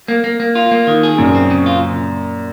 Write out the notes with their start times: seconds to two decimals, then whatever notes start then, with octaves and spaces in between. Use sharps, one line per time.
0.08 A#3
0.24 A#3
0.40 A#3
0.55 F4
0.71 A#3
0.87 D#3
1.03 G#4
1.18 F#2 A#2 C#3
1.35 C4
1.51 C#3
1.66 F4